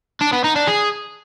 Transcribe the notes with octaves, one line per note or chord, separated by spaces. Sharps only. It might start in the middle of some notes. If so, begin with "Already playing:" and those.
D4
B3
D#4
D4
G#4